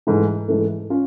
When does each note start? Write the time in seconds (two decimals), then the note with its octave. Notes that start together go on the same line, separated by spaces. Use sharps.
0.07 G#2 E3 A3
0.48 G#2 E3 A3
0.90 C#4 F4